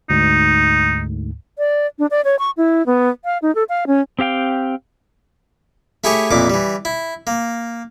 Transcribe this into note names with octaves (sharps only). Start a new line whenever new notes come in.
D2 G#2 D#4
D5
D4
D5
C#5
C#6
E4
B3
F5
D#4
A4
F5
C#4
C4 G4 F5 G5
A3 E4 G4 G#4 C#5
F2 A#2 E3 D6
E3 G3
E4
A#3